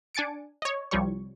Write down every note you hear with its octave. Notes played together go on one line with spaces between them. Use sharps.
D4 G#5 A6 C#7 D7
C#5 D#5
C2 F3 G3 C#5 C#6